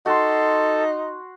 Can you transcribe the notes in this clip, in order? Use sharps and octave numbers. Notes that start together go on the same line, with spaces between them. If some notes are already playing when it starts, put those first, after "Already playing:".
D#4 F#4 A4 C6